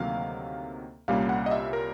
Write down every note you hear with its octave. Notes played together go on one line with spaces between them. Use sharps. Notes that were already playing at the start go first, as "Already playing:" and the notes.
Already playing: D2 C3 D#3 F#3 A#3 F5
C2 A#2 G3 A#3 C#4 F5
F#5
D#5
E5
A#4